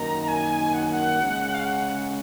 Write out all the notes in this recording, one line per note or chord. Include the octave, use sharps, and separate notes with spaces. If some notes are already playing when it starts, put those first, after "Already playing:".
Already playing: F#2 D#3 A#3 D#4 A#5
G#5
F#5
G#5
F#5
C#3 G#3 C#4
F5
F#5